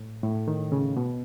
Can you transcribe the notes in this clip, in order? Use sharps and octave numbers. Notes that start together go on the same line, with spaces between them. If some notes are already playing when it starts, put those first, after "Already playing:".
Already playing: A2
A2
D#3
C#3
B2